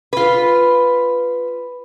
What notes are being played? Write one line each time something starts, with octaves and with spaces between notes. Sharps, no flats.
F4 B4